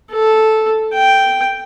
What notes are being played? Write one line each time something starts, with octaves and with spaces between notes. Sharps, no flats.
A4
G5